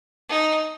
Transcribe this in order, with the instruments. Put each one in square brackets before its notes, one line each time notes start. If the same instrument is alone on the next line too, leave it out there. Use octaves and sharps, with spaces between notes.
[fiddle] D#4